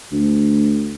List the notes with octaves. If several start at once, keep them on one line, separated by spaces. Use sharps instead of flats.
D2